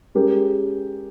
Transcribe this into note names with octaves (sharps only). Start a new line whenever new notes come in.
G#3 C#4 G4 A#4